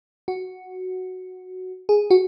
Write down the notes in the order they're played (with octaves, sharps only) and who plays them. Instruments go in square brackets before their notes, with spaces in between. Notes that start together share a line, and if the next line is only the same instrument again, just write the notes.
[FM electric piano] F#4
G#4
F#4